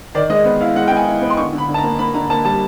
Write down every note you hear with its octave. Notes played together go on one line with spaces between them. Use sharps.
D#3 D5
G#3 D#5
B3
E4 F5
G#3 F#5
B3 G5
G#5
E4
B3
C6
D3 C#6
D3
B5
D3
A5
A#5
A#3
A#3 B5
D3 A#5
A#3 A5
G3 A5